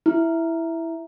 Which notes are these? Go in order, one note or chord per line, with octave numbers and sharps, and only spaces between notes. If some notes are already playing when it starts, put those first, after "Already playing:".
E4